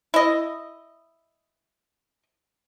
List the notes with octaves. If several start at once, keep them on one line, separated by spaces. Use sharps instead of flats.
E4 D#5